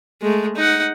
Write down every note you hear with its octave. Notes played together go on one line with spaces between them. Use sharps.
G#3 A3
D#4 F#5